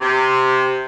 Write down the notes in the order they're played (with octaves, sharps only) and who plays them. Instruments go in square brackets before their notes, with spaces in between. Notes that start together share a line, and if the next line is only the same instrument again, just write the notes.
[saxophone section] C3